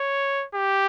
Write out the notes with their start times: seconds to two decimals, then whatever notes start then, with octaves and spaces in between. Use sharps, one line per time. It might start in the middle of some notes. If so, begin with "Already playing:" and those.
Already playing: C#5
0.54 G4